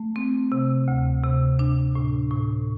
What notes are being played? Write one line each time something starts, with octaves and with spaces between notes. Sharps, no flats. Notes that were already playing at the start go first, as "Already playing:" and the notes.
Already playing: A3
C4
C3
D2
C3
D4
A2
A2